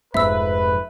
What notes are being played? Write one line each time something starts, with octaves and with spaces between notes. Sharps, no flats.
F1 F2 G#2 B4 E5 E6